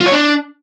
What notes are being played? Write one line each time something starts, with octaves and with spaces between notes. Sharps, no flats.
F4
C#5
D4